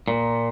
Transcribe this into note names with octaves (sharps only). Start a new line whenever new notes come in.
A#2